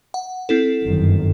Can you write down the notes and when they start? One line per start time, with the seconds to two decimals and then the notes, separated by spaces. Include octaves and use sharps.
0.14 F#5
0.49 C4 E4 A4
0.84 G1 F#2 D#3